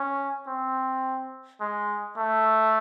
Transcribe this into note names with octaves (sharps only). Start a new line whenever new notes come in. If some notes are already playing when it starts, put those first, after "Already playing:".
Already playing: C#4
C4
G#3
A3